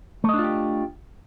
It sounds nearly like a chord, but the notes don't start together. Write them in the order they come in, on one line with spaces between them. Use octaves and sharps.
A3 D#5 D4 F4 G4